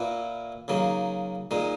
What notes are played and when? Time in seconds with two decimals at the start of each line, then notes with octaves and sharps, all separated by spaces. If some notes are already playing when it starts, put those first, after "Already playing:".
Already playing: A#2 A#3 E4 B4
0.68 C#3 F#3 A#3 D#4
1.51 A#2 G#3 D#4